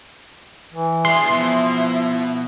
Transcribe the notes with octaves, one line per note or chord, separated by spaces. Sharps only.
E3
G#3 D4 E4 G#4 C6
B2 F3 E4